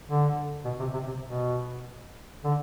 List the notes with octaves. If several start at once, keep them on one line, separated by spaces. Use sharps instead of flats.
D3
B2
C3
C3
C3
B2
D3